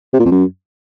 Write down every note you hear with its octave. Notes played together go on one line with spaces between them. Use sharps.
C3
A#2
F2
F#2